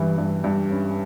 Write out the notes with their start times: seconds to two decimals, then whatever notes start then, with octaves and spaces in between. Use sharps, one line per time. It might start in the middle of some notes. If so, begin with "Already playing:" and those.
Already playing: G2 E3
0.18 G2
0.44 G2
0.70 C#4